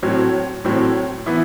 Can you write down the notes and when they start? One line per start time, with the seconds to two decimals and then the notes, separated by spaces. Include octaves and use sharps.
0.02 A2 F#3 C4
0.64 A2 F#3 C4
1.26 E3 B3 E4